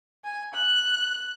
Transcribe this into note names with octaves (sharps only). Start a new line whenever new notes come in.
G#5
F#6